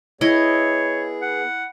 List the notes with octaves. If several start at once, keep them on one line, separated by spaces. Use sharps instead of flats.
B3 E4 G#4 C#5 D#5
F#5